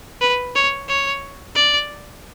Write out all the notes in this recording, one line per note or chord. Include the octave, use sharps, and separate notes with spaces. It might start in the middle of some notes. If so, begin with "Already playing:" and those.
B4
C#5
C#5
D5